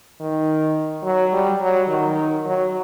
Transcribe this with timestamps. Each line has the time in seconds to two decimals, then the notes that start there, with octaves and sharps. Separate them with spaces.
0.20 D#3
1.04 F#3
1.33 G3
1.61 F#3
1.88 D#3
2.45 F#3